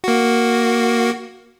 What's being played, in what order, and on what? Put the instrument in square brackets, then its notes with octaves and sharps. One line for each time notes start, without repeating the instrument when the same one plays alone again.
[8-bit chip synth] A#3 F#4